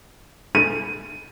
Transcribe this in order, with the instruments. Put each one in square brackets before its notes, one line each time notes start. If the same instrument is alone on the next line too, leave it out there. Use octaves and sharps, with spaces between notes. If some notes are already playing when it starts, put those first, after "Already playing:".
[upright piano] D#7